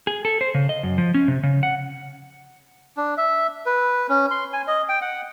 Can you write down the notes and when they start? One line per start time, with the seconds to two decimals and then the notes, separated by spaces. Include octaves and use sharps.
0.07 G#4
0.25 A4
0.41 C5
0.54 C#3
0.69 D#5
0.83 F#2
0.98 F3
1.14 C#4
1.28 C3
1.43 C#3
1.63 F#5
2.97 D4
3.17 E5
3.66 B4
4.09 C#4
4.31 C6
4.53 G#5
4.68 D#5
4.89 G5
5.02 F#5